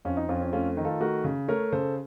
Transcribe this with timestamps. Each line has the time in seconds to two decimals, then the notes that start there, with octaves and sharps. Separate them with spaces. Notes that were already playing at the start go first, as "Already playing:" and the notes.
0.05 F2 C#4 F4
0.17 D#4
0.29 F2 C#4 F4
0.41 C#4
0.53 A3 C#4 F4
0.77 D#3
0.85 F4 A4
1.00 A3 F#4 A#4
1.24 C#3
1.48 A3 A#4 C#5
1.72 C#3 A4 C5